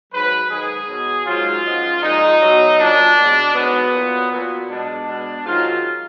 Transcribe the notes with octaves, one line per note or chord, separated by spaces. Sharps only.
G#2 F#3 B4
G#2 D#3 G#3 G#4
B2 F#3
G#2 F#3 F4
F#2 F3 G#3
A#2 F3 G#3 D#4
B2 F#3
A#2 F#3 D4
B2 G#3
G#2 D#3 F#3 B3
A#2 F#3
A#2 F#3 B3
B2 G#3 D4
B2 G#3
G#2 D#3 F#3 F4